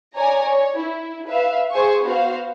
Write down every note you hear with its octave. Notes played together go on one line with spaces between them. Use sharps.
C#5 D5 G#5 A#5
C#5
E4
B4 E5 F5
G#4 C5 G#5 C#6
B3 F#4 C5 F5